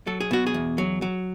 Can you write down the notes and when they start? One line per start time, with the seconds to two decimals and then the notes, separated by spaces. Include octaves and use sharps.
0.07 F#3 A4
0.20 G#4
0.31 B2 F#4
0.47 G#4
0.54 E2
0.78 F#3
1.02 F#3